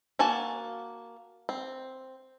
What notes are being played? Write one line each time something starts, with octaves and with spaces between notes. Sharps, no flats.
A#3 F#4 G#5 A5
C4